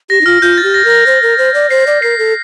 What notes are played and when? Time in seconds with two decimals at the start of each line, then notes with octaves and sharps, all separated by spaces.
0.10 G4 A#6
0.21 D#4
0.26 F4 F6
0.42 F4 G6
0.57 A6
0.64 G4
0.74 A#6
0.85 A#4
0.90 A#6
1.07 C5
1.22 A#4
1.38 C5
1.54 D5
1.70 C5 C7
1.87 D5
2.02 A#4 C7
2.19 A4